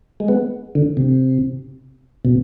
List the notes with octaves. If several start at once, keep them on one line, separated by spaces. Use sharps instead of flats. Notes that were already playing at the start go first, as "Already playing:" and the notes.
G#3
B3
D3
C3
B2